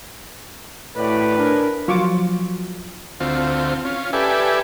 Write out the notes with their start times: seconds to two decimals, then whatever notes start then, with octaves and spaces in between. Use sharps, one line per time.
0.97 A2 F#4 G4 B4 D5
1.38 D4 G#4 A#4
1.88 F3 F#3 F4 C#6 D6
3.20 D2 C4 F4
3.85 C#4 F4
4.13 G4 A4 B4 D5 E5 G#5